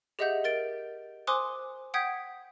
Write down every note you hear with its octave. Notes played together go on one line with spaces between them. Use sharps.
G4 G#4 D#5 E5 F#5 G6
A#4 A6 D7
C5 G#5 C6 D6 D#6 F#6
F#5 G5 D#6 G6 G#6 B6